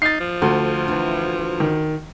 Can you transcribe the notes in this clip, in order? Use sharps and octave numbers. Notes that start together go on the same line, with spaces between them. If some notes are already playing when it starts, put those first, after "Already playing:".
D#4 A6 C7
F3
D2 A4
E3 D4
D#3